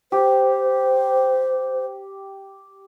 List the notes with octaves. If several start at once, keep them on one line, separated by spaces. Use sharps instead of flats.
G4 C5